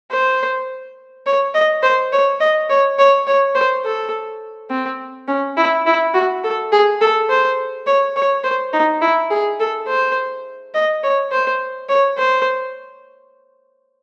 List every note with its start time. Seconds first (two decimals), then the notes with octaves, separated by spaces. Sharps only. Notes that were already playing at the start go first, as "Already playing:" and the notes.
0.11 C5
1.26 C#5
1.54 D#5
1.83 C5
2.13 C#5
2.40 D#5
2.70 C#5
2.99 C#5
3.27 C#5
3.55 C5
3.85 A4
4.70 C4
5.28 C#4
5.57 E4
5.86 E4
6.14 F#4
6.44 A4
6.72 G#4
7.01 A4
7.30 C5
7.87 C#5
8.16 C#5
8.44 C5
8.73 D#4
9.01 E4
9.31 G#4
9.60 A4
9.88 C5
10.75 D#5
11.04 C#5
11.32 C5
11.89 C#5
12.18 C5